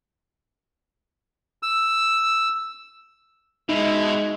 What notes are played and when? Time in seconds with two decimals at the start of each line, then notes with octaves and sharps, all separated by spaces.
1.63 E6
3.69 B2 G#3 D#4 E5